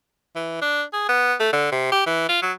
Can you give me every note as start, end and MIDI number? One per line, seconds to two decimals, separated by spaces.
0.36 0.60 52
0.61 0.83 62
0.93 1.06 68
1.09 1.34 59
1.40 1.52 57
1.53 1.67 50
1.72 1.87 48
1.92 2.04 67
2.06 2.26 52
2.29 2.39 65
2.42 2.52 54